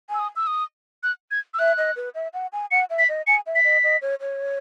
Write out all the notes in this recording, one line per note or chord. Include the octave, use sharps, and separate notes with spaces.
G#5 E6
D#6
E6
D#6
F#6
G#6
E6
E5 F#6
D#5
B4
E5
F#5
G#5
F#5 C#7
E5
B6
D#5
G#5 C#7
E5
B6
D#5
D#5
C#5
C#5